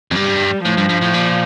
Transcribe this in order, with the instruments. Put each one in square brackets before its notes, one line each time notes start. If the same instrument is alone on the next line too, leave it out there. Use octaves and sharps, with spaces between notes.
[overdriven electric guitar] F2
[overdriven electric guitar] G2 [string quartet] G3
[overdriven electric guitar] A2 [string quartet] F3
[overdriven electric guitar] G2
G2
A2
A#2